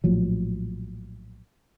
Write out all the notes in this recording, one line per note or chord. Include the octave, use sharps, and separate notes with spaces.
A#1 A2 F3 F#3